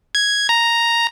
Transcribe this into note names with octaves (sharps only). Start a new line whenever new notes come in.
G#6
A#5